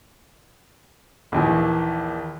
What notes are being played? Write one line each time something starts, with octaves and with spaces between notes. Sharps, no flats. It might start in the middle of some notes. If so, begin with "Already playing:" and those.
A#1 D#2 E3